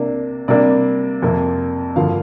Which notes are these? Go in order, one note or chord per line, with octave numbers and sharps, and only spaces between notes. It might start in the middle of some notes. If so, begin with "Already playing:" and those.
Already playing: C3 A#3 D4
C3 G3 A#3 D4 D5
F2 C3 A#3
G2 D3 F3 A#3 F5